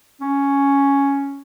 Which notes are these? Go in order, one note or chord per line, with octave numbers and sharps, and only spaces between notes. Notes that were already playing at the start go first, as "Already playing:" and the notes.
C#4